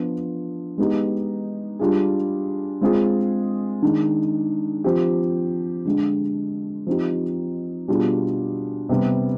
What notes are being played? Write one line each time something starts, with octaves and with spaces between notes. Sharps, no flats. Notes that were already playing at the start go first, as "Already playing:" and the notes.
Already playing: F3 B3 D4 F4
G#3 B3 D#4 G4
G3 D4 F4 G#4
G#3 C4 F4 G#4
D#3 G#3 D4
F3 C4 G4
D3 G#3 D4
F3 C4 D#4 G4
B2 G3 D4 F4 G#4
C3 G3 B3